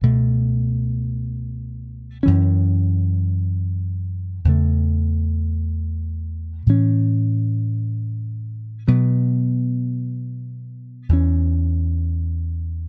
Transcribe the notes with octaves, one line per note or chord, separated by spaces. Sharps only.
C#2 B2 A3
F#2 E3 C#4
E2 C#3 A3
A2 E3 C#4
B2 F#3 B3
E2 E3 C#4